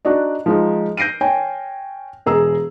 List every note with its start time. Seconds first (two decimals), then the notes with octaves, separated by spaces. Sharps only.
0.05 D4 D#4 F#4 D5 D#5
0.46 F3 G#3 D#4
0.97 G6 A#6 C7 D7 D#7
1.21 C#5 G5 G#5
2.26 E1 G#4 A#5 E6